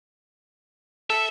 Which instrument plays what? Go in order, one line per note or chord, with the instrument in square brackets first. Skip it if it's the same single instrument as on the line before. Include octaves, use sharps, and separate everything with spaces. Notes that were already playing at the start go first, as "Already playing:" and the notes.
[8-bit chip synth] A4 [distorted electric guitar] E5